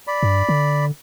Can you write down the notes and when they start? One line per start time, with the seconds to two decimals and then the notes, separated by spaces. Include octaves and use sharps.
0.07 D5 B5
0.23 G2
0.49 D3